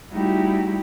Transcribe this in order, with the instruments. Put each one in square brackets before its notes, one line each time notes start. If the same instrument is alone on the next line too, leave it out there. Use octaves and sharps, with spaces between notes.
[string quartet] G3 A3 D#4 E4 F#4 G4